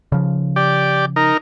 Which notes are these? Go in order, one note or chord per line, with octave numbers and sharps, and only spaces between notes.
C#3 F3
G4 D5
D#4 A#4